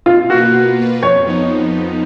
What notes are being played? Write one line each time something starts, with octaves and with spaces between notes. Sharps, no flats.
B2 F4
A#3 F4 F#4 B4
B2
A#3 F4 B4
F2 C#5
F3 B3 D#4